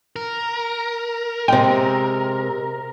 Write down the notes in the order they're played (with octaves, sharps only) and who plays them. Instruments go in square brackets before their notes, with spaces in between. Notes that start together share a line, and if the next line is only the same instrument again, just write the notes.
[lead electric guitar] A#4
[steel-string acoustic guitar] C3 G#3 [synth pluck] G5